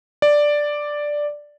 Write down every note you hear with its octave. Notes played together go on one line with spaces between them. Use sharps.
D5